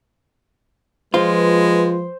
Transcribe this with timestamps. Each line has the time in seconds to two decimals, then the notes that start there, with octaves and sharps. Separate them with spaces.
1.14 F3 G#3 F4 B4 C5